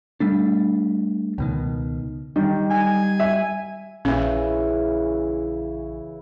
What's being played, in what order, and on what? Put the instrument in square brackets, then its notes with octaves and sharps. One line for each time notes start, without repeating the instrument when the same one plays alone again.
[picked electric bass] G3 A3 D4
C#2 B2 D#3
[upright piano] D#3 [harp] G3
[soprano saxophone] G#5
[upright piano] E5
[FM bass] A#1 [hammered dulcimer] C#3 E3 [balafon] C#4